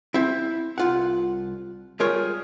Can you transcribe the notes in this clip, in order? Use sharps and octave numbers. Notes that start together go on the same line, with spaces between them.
C4 E4
C2 F4 F#5
G3 G#3 F4 G#4 A#4 C#5